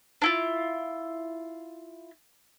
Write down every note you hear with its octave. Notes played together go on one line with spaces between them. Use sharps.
D4 E4 F4